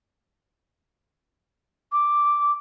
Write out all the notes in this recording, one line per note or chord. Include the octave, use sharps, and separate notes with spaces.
D6